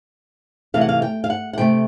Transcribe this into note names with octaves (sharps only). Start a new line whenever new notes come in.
C3 E3 A3 F5
F#5
F5
G5
F5
F#5
F#5
C3 E3 A3 G5